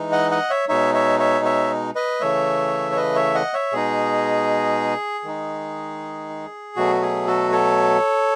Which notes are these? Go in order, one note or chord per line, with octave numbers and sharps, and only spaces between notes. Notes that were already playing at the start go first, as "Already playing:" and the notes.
Already playing: E3 G#3 D#4
D#5 F#5
D#5 F#5
C#5 E5
B2 G#3 D#4 C#5 E5
C#5 E5
C#5 E5
C#5 E5
B4 D#5
C#3 E3 A3 C#5 E5
C#5
B4 D#5
C#5 E5
D#5 F#5
C#5 E5
B2 G#3 D#4 G#4
D#3 G#3 D#4
B2 F#3 A3 F#4
G#4
F#4 A4
A4 C#5